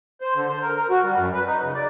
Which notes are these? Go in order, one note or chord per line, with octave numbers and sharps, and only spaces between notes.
C5
D3
C5
A#4
A#4
F#4
G3
F#2
B4
D#4
C#3
D5